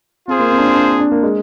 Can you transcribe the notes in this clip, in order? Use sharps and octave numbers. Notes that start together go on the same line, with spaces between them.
C4 F4 G#4 C5
A#3
C4
D4
C4
D4
D4
A#3
G#3